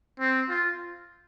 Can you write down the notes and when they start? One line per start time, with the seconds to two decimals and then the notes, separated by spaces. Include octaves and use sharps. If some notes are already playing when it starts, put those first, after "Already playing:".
0.20 C4
0.49 F4